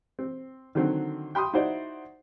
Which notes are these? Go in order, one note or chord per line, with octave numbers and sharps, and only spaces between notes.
C4
D3 D#3 F#3 C4
G5 B5 C6 D#6
D#4 E4 F#4 C5 D5